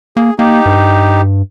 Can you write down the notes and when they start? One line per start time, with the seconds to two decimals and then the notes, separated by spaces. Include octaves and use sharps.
0.17 A#3 G#4
0.39 A#3 D#4 G4
0.66 G2